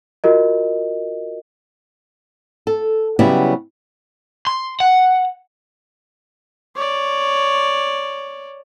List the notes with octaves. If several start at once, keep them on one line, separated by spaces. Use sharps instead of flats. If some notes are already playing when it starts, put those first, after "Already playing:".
F4 F#4 A#4 D#5
A4
C#3 F#3 G3 B3 E4 G4
C6
F#5
C#5 D5